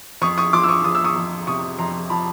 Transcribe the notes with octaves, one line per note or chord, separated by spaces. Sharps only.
F2 C#6 D#6
C#6 D#6
F3 C6 D6
E6
C#6 D#6
F3 D#6
E6
C#6 D#6
F2
C3 C#6 D#6
F2 A#5 C6
F3 A5 B5